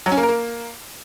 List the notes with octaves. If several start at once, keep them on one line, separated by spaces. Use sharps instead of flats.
F#3
C#4
A#3
A#4
A#3